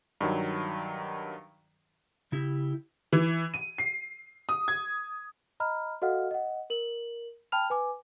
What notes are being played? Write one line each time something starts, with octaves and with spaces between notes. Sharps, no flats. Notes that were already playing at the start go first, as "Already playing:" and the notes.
G2 D#3 F#3
C#3 E4 G4
E3
D#7
C7
D#6
G#6
D#5 A#5 B5 F6
F#4 A4 D#5 F5 F#5 F6
D#5 F#5
A#4 F#7
G5 A5 B5 F6 F7
B4 G#5 D6